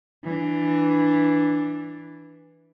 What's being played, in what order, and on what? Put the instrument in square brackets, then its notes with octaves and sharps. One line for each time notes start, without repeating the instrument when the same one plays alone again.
[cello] E3 D4